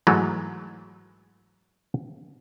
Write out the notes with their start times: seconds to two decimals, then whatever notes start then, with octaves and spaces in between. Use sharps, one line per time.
0.07 G#2 E3 F#3 G#3 A3